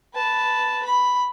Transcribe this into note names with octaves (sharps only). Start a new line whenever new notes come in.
B4 A5
B5